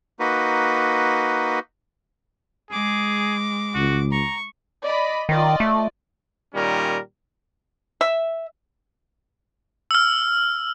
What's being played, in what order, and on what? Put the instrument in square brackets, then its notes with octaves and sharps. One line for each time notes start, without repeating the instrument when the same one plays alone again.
[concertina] A#3 D#4 F#4 B4
[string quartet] G#3 D6 [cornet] G#4
[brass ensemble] C#2 [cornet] F#4
[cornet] A#5 [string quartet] C#6
[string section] D5 D#5 B5
[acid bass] D#3 [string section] F4 D5 D#5
[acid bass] A3
[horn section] A#2 D#3 G3 C#4 A#4
[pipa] E5
[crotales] E6 F6